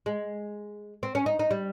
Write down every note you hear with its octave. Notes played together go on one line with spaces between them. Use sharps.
G#3
C4
C#4
D#4
D#4
G3